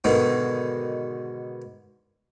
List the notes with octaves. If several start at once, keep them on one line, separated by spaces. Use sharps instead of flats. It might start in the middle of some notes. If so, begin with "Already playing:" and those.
G#2 B2 D3 D#3